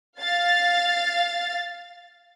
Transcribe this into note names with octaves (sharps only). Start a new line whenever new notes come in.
F5 A6